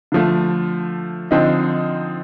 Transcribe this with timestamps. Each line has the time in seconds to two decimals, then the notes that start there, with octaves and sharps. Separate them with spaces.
0.12 D3 F3 A3
1.31 D3 F3 C4 D#4